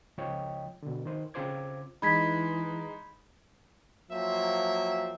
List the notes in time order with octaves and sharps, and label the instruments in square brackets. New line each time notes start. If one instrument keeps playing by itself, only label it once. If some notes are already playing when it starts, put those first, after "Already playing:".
[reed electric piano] C#2 F3 C#5 D#5 G5
B2 D3
D#3 C5
C#3 C4 F4 C5 D6 G#6
[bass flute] E3 [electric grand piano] G#3 D#4 [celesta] B5 G#6 B6
[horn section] F3 F#3 A#3 C4 E5